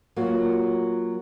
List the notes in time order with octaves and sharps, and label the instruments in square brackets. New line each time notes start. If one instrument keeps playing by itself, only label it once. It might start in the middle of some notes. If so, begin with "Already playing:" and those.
[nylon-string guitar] F#3 A#3 F4 F#4